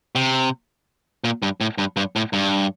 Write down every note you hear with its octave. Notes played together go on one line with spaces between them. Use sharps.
C3
A#2
G2
A2
G2
G2
A2
G2